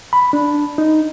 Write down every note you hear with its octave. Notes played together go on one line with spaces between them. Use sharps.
B5
D4
D#4